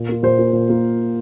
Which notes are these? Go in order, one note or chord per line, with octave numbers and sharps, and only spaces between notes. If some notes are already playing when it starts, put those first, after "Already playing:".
Already playing: A#2
A#3 F4
A#2 C5
A#3 F4
A#2
A#3 F4